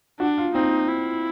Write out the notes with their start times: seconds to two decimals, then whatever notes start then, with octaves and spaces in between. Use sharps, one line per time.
0.20 D4 F#4
0.38 F4
0.55 C4 D#4
0.89 E4